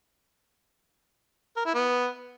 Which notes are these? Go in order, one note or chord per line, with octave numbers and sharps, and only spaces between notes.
A#4
E4
B3